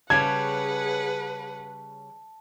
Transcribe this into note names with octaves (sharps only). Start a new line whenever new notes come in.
C#3 G3 C#4 G#4 B4 F#5 A5 G#6